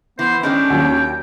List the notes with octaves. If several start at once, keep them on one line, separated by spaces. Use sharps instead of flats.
E3 B3 C5
D#3 G#3 C#4 D4 G5
D#2 F#3